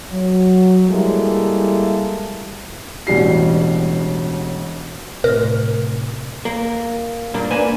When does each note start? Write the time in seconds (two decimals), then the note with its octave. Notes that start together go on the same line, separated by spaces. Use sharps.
0.11 F#3
0.89 G3 G#3 A#3 E4 A4
3.07 E1 A1 G3 F#4 C7
5.24 A2 C3 A#4
6.45 A#3
7.34 G2 A#2 A#3 D4
7.51 G#2 A#3 D4 B4 C5 G#5